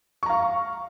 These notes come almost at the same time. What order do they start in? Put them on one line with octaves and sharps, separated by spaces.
C#6 A#5 F5